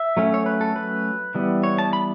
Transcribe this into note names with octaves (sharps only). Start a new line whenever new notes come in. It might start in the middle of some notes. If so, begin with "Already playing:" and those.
Already playing: E5
F#3 A3 C#4
C#5
B4
A4
B4
E3 G3 B3
C#5
A5
B5